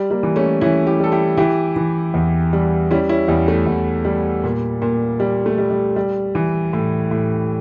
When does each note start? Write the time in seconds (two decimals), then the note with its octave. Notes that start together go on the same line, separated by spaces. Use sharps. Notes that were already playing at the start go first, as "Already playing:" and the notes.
Already playing: G3
0.10 G3 A#3
0.23 E3
0.36 A3 C#4
0.61 E3 C#4 E4
0.87 E4 G4
0.99 G3 A4
1.12 E4 G4
1.37 E3 E4 G4
1.76 E3
2.14 E2
2.53 G3
2.91 G3 C#4 E4
3.09 C#4 E4
3.28 E2 G3
3.48 A3
3.67 E2
4.05 G3
4.44 A#2
4.82 A#2
5.20 G3
5.46 A3
5.58 G3
5.71 G3
5.96 G3
6.35 E3
6.73 A2
7.11 A2